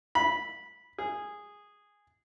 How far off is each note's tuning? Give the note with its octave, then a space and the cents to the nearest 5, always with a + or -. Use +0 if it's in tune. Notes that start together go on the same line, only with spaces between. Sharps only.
B5 -10
G#4 -10